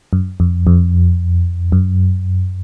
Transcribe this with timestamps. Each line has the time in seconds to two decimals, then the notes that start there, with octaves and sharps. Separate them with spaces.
0.13 F#2
0.40 F2
0.67 F2
1.72 F#2